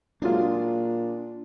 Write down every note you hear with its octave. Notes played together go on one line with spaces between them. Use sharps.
A#2 F#3 G#3 D4 F4